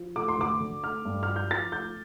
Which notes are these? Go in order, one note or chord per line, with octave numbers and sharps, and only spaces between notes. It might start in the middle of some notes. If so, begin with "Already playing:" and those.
Already playing: F3
A3 D6
C6
D2 D6
D3
A3 F6
G2
F6
F3
G6
F3 A6
A3 G6